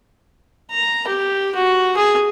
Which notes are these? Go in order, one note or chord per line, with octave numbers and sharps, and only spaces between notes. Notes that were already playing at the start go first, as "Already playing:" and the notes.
A#5
G4
F#4
G#4